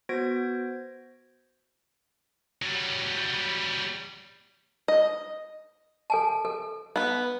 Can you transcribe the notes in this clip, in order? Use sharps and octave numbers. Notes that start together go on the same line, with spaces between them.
B3 F#4 C5 G#6 A#6 D7
F#3 G3
D#5
A4 G#5 A5
A4
B3 B4